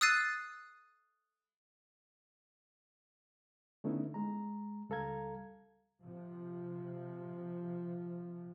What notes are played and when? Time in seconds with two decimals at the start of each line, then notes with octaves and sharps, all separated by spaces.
0.01 D#6 E6 F#6 A6 C7 D#7
3.84 D3 A3 B3 C#4 D#4 E4
4.14 G#3 A#5
4.89 C#2 G3 A4 F5 A#5 G#6
6.03 C3 F3